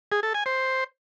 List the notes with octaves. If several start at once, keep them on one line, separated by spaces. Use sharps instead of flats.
G#4
A4
G#5
C5